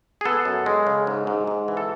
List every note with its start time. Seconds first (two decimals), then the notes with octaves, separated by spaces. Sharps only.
0.21 G#4
0.25 B3 A4
0.45 F#2
0.66 G#3
0.87 C#3
1.07 G#2
1.27 G#2
1.47 G#2
1.68 E3
1.77 A4